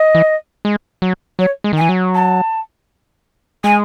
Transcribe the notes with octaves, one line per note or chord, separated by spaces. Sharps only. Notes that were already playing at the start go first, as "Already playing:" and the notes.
Already playing: D#5
E3
G#3
F#3
F#3 C#5
G#3
D#3
E3 G#5
F#3
A5
G#3 G#5